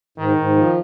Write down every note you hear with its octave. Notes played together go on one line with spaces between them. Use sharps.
G#2 D#3
G#2
F3